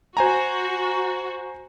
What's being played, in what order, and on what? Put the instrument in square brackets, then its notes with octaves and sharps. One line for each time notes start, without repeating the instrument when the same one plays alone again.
[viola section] F#4 [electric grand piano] C5 G#5 A#5